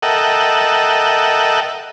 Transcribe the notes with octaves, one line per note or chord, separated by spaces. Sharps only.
A4 A#4 D#5 E5 F#5 G5